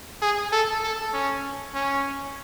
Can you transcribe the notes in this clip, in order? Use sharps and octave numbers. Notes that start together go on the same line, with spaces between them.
G#4
A4
A4
C#4
C#4